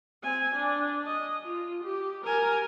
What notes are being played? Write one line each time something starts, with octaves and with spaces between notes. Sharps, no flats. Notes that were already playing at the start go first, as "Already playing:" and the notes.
C4 G#5
D4
D#5
F4
G4
A#4 G#5